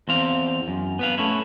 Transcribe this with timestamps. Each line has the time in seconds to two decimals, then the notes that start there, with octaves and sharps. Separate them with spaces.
0.08 E2 C4 F5
0.68 F#2
0.99 B3 B4 F5
1.18 A3 C#4 E4